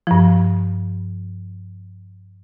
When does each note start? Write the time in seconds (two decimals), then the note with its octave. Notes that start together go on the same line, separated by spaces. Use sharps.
0.07 G2 F3